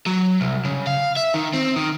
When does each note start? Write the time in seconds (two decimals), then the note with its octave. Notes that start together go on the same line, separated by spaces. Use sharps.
0.06 F#3
0.41 C2
0.65 C#3
0.87 F5
1.17 E5
1.34 D#3
1.53 C4
1.76 D#3